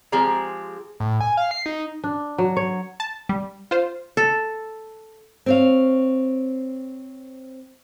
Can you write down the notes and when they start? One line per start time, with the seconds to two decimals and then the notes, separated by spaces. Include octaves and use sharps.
0.12 F3 G#3 C4 G4 G#4 A#5
1.00 A2
1.21 G#5
1.37 F5
1.51 C7
1.66 D#4
2.04 D4
2.38 F#3
2.57 C#5
3.00 A5
3.29 G3
3.71 F4 C5
4.17 A4
5.46 C4 C#5 F5